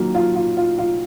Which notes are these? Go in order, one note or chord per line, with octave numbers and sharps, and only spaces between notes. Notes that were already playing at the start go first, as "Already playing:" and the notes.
Already playing: D#3 F#3 A#3 F4
F4
F4
F4
F4